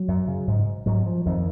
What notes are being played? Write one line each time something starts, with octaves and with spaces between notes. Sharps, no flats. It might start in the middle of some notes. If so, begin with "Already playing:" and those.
Already playing: F#3
F#2
C#3
G#2
G#2 F#3
F3
F2 D#3